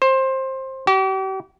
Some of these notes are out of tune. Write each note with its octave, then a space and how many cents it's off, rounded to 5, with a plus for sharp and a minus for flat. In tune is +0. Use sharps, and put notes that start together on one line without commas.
C5 +20
G4 -40